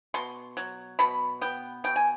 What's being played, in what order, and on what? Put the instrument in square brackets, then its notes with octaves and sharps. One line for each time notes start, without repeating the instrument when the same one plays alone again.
[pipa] B2 C6
F#3
B2 B5
B3 G5
B2 G5
G#5